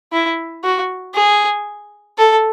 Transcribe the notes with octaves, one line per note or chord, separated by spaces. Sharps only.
E4
F#4
G#4
A4